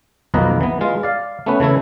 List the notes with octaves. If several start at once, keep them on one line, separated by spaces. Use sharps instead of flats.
B1 F2 D#3 A#3 B4 D#5
E3 B3
G#3 F4
D5 F5
A3 B3 C#4 B4
C#3 E3 A3 E4